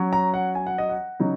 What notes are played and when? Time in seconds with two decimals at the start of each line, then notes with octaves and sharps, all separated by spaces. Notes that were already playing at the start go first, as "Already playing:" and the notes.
Already playing: F#3 C#4
0.13 A#5
0.34 F#5
0.55 G#5
0.67 F#5
0.78 D#5
0.89 F#5
1.20 C#3 F#3 D#4